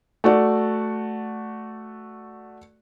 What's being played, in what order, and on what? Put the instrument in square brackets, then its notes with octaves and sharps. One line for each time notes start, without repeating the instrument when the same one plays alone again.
[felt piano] A3 F#4 D5